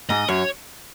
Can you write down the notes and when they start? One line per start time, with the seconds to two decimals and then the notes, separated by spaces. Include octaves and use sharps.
0.09 G#2 D#5
0.28 F#2 C#5